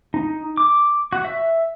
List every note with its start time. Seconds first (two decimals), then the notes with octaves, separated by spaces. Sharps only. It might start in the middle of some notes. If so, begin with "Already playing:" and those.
0.14 D#4
0.57 D6
1.13 F#4
1.25 E5